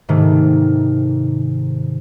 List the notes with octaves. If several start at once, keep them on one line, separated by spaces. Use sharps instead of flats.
G#2 C3 D#3 A3